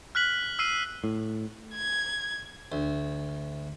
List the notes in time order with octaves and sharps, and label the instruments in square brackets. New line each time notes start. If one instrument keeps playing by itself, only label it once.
[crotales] F6 F#6 B6 F#7
E6 F6 C7 D#7
[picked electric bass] A2
[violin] G#6
[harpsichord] D2